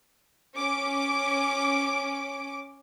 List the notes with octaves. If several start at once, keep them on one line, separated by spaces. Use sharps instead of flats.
C#4 D6 D7